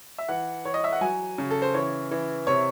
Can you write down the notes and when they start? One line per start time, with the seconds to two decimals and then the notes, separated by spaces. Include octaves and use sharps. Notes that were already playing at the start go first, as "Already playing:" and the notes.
0.18 E5
0.28 E3 F#5
0.65 E3 C#5
0.74 D#5
0.84 E5
0.92 F#5
1.01 F#3 G#5
1.38 C#3
1.51 A4
1.62 C5
1.74 E3 C#5
2.11 E3
2.47 C3 C#5